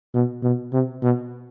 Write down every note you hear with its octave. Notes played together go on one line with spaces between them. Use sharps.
B2
B2
C3
B2